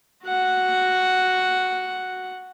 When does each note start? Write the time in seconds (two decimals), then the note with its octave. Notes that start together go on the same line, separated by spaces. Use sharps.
0.25 F#4 F#5